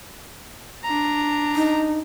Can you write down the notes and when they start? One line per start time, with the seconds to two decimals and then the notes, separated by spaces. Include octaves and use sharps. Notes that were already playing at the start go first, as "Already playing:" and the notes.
0.84 D4 A#5
1.55 D#4